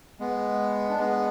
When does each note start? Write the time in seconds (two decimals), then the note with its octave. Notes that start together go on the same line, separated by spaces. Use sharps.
0.20 G#3 B3
0.89 D4
0.98 G#3 B3